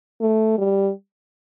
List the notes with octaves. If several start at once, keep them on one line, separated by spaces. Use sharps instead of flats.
A3
G3